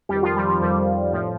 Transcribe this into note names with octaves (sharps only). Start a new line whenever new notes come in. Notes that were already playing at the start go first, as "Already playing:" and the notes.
F2 D#3 G3 G4
F3 F4
G3
F3
F2 D#3 G3
A2 F3